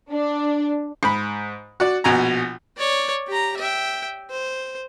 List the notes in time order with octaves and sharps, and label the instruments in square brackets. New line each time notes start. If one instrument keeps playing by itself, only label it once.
[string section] D4
[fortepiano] G#2 B5
F#4 D5
A#1 B2 G#5 A#5
[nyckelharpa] C#5 D5
G4 A#5
E5 G5
C5